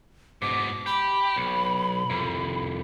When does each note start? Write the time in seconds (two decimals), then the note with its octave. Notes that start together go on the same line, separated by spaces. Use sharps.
0.42 G#2 B2 D6
0.86 G4 B5
1.36 B1
2.10 C2 F2